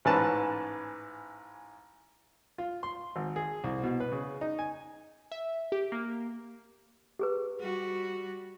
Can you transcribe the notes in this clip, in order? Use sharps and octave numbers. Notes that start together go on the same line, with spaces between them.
A1 G#2 E3 C#4 B4 A5
F4
C6
G#1
G#4
C2
B2
B4
C#3
D#4
G#5
E5
G4
A#3
G4 G#4 B4
G3 F#4